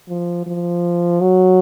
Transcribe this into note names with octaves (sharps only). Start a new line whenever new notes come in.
F3
F3
F#3